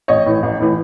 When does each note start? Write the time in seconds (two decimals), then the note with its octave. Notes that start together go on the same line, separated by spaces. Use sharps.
0.08 A1 C#5 D#5
0.26 A2 E3
0.43 A1
0.60 A2 E3